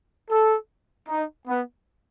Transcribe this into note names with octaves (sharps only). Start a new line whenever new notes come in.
A4
D#4
B3